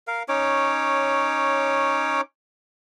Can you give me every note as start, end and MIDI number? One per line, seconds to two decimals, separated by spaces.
0.07 0.23 70
0.07 0.23 77
0.29 2.21 61
0.29 2.21 63
0.29 2.21 73
0.29 2.21 86